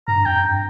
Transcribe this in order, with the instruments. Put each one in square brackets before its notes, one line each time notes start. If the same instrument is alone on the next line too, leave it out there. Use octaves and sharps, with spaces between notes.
[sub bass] G2 [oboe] A#5
[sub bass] F2 [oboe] G5
[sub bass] G2